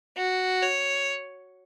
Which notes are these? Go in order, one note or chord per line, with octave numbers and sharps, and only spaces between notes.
F#4
C#5